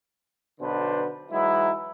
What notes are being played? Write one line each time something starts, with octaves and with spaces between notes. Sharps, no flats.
B1 B2 D3 D4 B4 C5
E3 F#3 G#3 D#4 E4